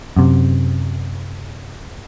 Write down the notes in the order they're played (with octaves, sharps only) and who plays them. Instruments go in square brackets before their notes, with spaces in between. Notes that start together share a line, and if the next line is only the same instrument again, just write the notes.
[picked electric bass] F#2 C3